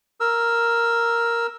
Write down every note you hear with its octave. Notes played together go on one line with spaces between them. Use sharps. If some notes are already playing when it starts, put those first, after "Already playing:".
A#4 E6